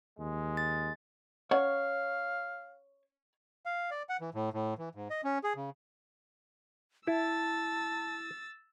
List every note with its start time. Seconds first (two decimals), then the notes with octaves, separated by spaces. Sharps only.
0.19 D#2 G#3
0.57 A6
1.51 C#4 C#5 F5 F#5
3.66 F5
3.91 D5
4.09 F#5
4.21 E3
4.34 A2
4.53 A2
4.78 E3
4.95 G#2
5.10 D#5
5.24 C#4
5.44 G#4
5.56 C#3
7.07 E4 A5 E6 A6